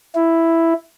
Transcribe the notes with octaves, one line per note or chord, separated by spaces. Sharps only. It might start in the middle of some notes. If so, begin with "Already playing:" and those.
E4